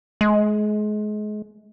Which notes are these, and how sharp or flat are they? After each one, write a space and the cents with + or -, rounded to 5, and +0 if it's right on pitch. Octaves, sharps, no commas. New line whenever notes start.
G#3 +30